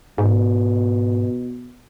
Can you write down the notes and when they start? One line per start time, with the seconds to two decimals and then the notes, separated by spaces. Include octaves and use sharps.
0.18 G#2 B2